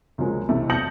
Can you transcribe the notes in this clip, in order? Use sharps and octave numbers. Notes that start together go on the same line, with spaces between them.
C#2 C3 F3 F#3 G#3 A#3
B1 C3 E3 A3 E4
A5 D#6 G6 A#6 C#7 F#7